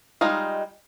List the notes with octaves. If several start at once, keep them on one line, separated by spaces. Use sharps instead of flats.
G3 G#3 D#4 F4 D#5